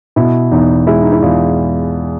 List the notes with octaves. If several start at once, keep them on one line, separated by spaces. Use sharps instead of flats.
B2 E4
E2 D#4
G#3 E4
D#4
E4
E2 F4